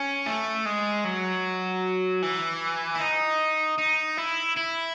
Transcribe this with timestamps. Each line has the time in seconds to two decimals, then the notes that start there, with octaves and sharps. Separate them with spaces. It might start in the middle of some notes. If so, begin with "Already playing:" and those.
Already playing: C#4
0.26 A3
0.66 G#3
1.05 F#3
2.22 E3
2.96 E4
3.01 D#4
3.79 D#4
4.18 E4
4.57 E4